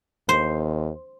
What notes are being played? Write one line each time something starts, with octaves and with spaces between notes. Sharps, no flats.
D#2 C5